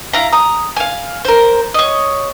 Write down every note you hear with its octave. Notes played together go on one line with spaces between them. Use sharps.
E4 F5 A#5
A#5 D#6
F5 G#5
A#4 C5
C#5 D#5